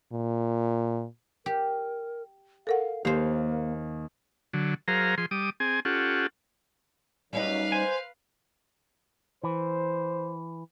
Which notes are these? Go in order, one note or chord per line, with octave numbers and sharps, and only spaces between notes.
A#2
G4 A#4
A4 A#4 F5 F#5
D#2 A#3 G4 C5 F5
D3 F#3
F#3 G#4 A#4 C5 F5 A#5
F3 G#4 C6
G3 D6 D#6
C4 G#4 G#5
C#4 F4 G4 A4 F#5
F#2 G3 C#4 D#4 B4 F5
C5 G#5
E3 C5